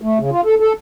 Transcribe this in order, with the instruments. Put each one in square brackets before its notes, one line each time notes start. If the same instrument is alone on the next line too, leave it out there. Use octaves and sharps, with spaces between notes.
[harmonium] A3
C#3
F4
A4
A4